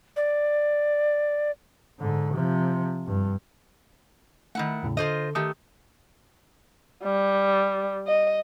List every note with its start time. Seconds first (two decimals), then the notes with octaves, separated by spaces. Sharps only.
0.16 D5
2.00 G#2 D3
2.34 C3 F3
3.07 G2
4.55 D#3 A3 E4 F#5
4.83 E2 A2 C#3
4.97 D3 F4 A4 C5 D#5
5.35 D#3 A3 G4 D#6
7.04 G3
8.08 D#5